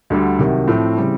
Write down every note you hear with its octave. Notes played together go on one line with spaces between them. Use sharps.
D2 D3 G3
C2 C3 D#3 F#3
A2 F3 A3 C4
C#3 E3 G3 C4